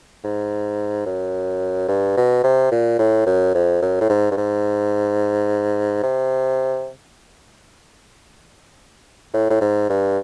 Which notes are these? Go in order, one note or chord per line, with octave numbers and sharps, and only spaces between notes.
G#2
F#2
G2
B2
C3
A#2
A2
F#2
F2
F#2
A2
G#2
G2
G#2
C3
A2
A2
G#2
G2